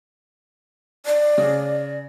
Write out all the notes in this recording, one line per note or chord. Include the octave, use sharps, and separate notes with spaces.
D5
C#3